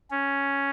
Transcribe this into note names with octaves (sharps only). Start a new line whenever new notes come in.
C#4